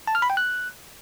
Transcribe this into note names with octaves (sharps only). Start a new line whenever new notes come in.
A5
F6
B5
G5
F#6